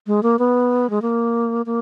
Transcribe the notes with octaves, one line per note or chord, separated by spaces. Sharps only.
G#3
A#3
B3
G#3
A#3
A#3